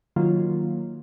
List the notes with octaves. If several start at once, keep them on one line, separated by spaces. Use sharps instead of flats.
D#3 F#3 A#3 F4